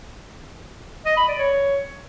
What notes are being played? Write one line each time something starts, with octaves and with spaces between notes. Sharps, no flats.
D#5
B5
D5
C#5